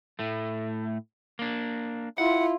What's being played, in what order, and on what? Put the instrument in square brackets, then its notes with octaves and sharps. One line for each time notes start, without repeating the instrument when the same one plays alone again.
[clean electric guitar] A2 A3
A#3 D4
[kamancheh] E4 F4 [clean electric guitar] F#5